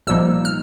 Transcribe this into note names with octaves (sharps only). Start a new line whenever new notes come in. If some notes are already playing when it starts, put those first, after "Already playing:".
C2 A#2 F3 A#3 D#4 E6
F6